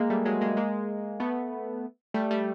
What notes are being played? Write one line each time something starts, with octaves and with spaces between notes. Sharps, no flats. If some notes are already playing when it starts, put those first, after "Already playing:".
Already playing: G#3 A#3
G3 A3
F#3 G#3
G#3 A#3
G#3 A#3
A3 B3
G3 A3
G3 A3